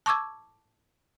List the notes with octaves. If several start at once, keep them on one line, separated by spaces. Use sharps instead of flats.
A5 C#6 D6 E6 G#6